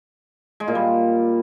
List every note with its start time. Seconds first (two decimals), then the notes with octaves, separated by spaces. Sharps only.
0.60 G#3
0.68 A#2
0.75 G3